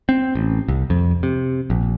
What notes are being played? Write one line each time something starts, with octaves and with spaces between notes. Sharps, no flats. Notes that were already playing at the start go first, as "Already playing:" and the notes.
C4
A1
C2
F2
C3
A#1